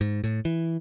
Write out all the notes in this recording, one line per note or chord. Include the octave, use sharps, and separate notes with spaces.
G#2
A2
E3